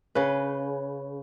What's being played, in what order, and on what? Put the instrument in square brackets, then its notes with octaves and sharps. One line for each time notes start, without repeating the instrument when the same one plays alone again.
[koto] C#3 B4